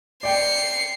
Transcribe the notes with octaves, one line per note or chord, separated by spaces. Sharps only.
D5 G5 C7 C#7